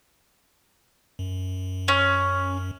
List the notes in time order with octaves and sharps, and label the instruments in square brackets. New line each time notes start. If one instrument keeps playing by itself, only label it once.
[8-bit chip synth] F#2
[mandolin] C#4